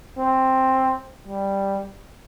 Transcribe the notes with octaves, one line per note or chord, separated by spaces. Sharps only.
C4
G3